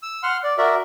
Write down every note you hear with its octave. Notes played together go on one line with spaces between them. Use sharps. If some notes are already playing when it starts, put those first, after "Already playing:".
E6
F#5 C6 F6
D5
F#4 A#4 D5 E5